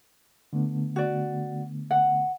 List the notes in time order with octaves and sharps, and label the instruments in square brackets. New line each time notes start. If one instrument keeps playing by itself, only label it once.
[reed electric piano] D3 A3 B3
[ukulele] F#4 D5
F#5